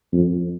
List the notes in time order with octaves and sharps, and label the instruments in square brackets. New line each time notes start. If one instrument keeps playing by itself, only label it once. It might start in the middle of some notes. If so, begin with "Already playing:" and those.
[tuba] F2